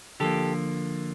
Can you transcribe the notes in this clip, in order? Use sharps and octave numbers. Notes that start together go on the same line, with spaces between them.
D3 F3 A#3 G4 A4